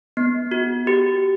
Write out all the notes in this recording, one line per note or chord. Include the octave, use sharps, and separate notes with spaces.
B3
F#4
G4